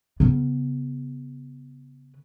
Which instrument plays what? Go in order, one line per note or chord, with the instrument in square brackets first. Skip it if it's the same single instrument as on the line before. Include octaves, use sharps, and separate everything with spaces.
[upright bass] C#3 B3